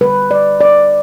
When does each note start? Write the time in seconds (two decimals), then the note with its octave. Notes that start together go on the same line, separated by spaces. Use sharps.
0.01 D3 G3 B4
0.31 D5
0.61 D5